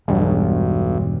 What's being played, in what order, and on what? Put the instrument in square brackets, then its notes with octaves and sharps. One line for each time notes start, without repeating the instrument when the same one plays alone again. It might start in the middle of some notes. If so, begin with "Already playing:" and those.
[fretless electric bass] E1 G2 [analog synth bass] B1